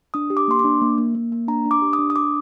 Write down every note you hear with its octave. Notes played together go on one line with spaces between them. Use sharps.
D4 D#6
G4
D6
A#3 C6
D6
D4
A#3
A#3
A#3
A#3
D4 A#5
D4
D6
G4
D#6
D4
D#6
D4 D6